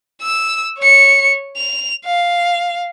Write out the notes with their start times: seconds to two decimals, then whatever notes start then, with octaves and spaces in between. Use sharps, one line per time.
0.22 E6
0.79 C#5 C#7
1.57 F7
2.05 F5